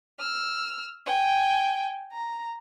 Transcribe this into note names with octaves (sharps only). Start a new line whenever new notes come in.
E6 F6
G5 G#5
A#5